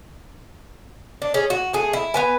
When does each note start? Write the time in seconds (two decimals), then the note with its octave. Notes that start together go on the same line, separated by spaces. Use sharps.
1.22 D4
1.34 C#4 G#4
1.50 F#4
1.73 A3 G#4
1.93 E4
2.14 B3 B4 G#5